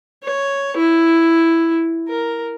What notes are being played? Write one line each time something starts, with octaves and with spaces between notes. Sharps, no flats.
C#5
E4
A#4